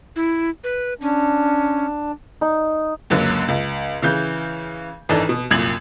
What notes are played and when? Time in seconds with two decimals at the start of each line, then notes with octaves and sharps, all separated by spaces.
0.16 E4
0.64 B4
1.01 C#4 D4
2.41 D#4
3.10 C#2 F#2 D3 F#3 A#3
3.48 C#2
4.02 C#3 E3 G6
5.09 G#1 E3 D4 D#4 A4 A5
5.29 B2
5.51 C2 F#2 A#2 G#6 F#7